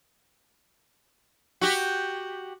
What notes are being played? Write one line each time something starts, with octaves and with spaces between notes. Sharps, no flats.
F#4 G4